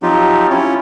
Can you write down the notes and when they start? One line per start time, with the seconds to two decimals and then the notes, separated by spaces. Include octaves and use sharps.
0.03 F3 F#3 C4 D#4 F4 G4
0.50 C#4 E4 F4 C#5